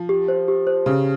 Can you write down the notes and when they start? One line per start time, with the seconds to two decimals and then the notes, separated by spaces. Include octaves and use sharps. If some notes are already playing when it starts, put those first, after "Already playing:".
Already playing: F3
0.09 G4
0.28 C5
0.48 G4
0.67 C5
0.86 C#3 G4